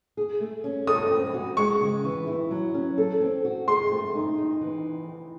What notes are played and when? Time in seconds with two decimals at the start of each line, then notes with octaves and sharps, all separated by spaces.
0.17 G#4
0.40 A3
0.64 C#4
0.87 A4 D#6
1.11 C4
1.34 F#4
1.57 G#3 C#6
1.81 C#3
2.04 E3
2.27 E4
2.51 F#3
2.74 C#4
2.98 A4
3.21 C4
3.45 F#4
3.68 G#4 C6
3.92 A3
4.15 D#4
4.38 D#4
4.61 E3